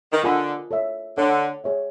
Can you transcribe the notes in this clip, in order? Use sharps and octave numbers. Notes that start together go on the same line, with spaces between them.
D#3
D3 F4 A#4 D#5 G#5 B5
A4 C#5 E5
D3 A4 C#5 F#5
G#4 C#5 E5